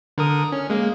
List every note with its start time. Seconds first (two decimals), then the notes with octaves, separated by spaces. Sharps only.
0.18 D3 A#4 D#6
0.52 C#4
0.70 G#3 A#3